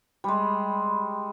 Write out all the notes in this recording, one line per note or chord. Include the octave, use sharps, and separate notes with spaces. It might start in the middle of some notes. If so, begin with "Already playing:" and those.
G3 G#3